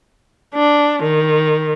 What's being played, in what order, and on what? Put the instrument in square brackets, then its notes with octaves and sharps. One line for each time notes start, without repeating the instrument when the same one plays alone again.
[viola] D4
D#3